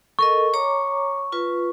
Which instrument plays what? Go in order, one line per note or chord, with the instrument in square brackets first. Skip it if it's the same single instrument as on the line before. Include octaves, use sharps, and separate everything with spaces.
[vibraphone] A4 A#4 D#5 [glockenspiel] C#6
[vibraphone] C#5 A#5 D6
F4 B4